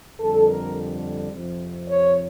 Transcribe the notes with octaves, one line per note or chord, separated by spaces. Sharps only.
F2 D3 G3 A4
A#4
F2 C3 F3
C#5